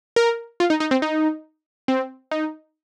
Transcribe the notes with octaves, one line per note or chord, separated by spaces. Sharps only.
A#4
F4
D#4
D#4
C4
D#4
C4
D#4